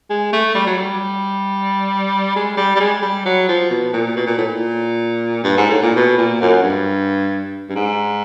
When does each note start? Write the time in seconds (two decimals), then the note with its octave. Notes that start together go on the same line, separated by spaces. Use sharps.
0.10 G#3
0.33 A3
0.55 G3
0.67 F#3
0.77 G3
2.36 G#3
2.57 G3
2.75 G3
2.80 G#3
3.02 G3
3.25 F#3
3.48 F3
3.70 B2
3.93 A#2
4.16 B2
4.27 A#2
4.37 A2
4.48 A#2
5.44 G2
5.57 G#2
5.70 A2
5.83 A#2
5.96 B2
6.18 A#2
6.41 F#2
6.63 G2
7.69 G2
7.76 G#2